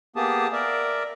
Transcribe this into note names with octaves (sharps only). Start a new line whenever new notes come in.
A#3 B3 G4 G#4 A5 D#6
A#4 D5 E5